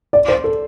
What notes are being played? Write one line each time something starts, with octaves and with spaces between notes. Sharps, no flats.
D5
C5
A4